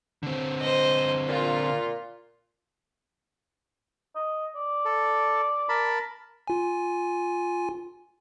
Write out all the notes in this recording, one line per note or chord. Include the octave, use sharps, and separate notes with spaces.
D3 C4
C5 D#5
A#2 F4
D#5
D5
A4
A#4 A5 B5
F4 G#5